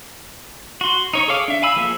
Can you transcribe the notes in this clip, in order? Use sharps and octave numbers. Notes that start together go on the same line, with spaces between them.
F#4 C6
D#4 C#5 C#6
G#4 A4 C#5 F5 D6
D4 E5
F5 G#5 B5 E6
F3 A#3 G#4 A4 E5